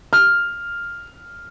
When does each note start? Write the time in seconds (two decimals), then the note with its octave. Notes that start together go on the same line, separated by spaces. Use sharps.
0.13 F6